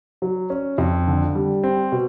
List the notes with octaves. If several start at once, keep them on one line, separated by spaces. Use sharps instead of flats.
F#3
C#4
F2
D3
G3
C4
B2